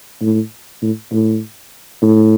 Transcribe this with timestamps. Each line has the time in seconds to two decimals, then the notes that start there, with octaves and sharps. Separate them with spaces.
0.21 A2
0.82 A2
1.12 A2
2.02 A2